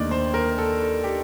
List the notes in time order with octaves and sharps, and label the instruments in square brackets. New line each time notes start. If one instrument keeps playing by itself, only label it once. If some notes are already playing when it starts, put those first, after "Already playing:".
Already playing: [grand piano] D#2 D3 A3 D#4 [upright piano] D5
[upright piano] C5
A#4
A4
G4